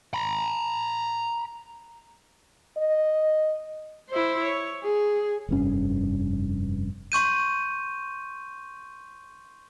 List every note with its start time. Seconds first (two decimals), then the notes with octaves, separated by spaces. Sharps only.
0.14 A#5 B5
2.78 D#5
4.10 E4 C5
4.44 C#5
4.84 G#4
5.49 F1 G2 C#4
7.12 C6 C#6 G6 D#7